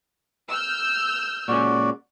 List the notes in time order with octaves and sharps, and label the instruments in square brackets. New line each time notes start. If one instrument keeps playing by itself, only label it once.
[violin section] E6 F6 G6
[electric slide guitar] A#2 G#3 C#4 [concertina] F#4 D5